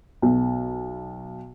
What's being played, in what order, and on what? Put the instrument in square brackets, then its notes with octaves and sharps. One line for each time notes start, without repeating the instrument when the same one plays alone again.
[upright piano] B1